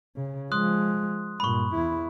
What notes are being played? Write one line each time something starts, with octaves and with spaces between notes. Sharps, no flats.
C#3
F3 G#3 C6 D#6 F#6
G2 A#2 B5 C#6
E2 E4